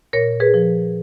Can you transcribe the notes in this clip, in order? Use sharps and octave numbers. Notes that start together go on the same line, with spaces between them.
A#2 A#4 C#5
G#4 B4
F3